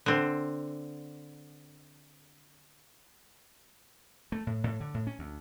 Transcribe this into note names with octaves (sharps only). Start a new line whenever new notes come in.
D3 C4
A3
A2
A2
D3
A2
C#4
D2